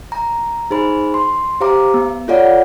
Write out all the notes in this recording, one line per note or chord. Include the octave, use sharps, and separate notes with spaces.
A#5
D#4 G#4 C5 B5
C6
G4 C5 F5 A#5 D6
B3
F4 A4 C#5 D5 F5 F#5